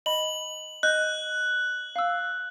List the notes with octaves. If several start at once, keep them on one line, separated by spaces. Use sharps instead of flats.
D#5 B5 F#7
D#5 F#6 G6
F5 E6